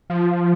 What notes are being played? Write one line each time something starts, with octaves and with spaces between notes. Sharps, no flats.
F3